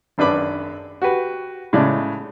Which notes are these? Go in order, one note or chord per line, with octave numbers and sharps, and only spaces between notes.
G#1 F#2 D4 B4 B5 D6
F#4 G4 B4
A2 C#3 G#3 D5